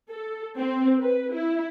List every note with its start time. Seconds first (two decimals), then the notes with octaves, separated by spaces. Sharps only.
0.11 A4
0.58 C4
1.00 B4
1.33 E4